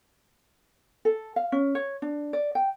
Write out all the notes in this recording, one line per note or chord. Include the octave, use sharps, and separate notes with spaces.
A4
F5
C#4
C#5
D4
D5
G5